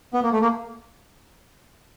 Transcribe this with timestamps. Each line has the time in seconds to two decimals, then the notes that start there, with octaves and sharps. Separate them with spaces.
0.14 B3
0.23 A#3
0.32 A3
0.41 A#3